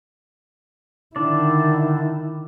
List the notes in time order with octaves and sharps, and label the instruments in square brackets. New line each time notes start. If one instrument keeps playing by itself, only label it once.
[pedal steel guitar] D3 D4 D5 [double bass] D#3 E4